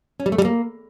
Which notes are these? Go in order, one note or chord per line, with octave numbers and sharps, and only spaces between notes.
C#4
G3
A3
G3
A#3